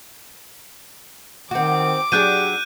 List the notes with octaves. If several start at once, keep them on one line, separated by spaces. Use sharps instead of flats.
D#3 C4 F#4 D6
F#3 D4 G4 G#4 F#6 G6 D#7